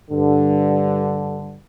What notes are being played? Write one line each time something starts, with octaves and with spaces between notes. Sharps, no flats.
G2 D3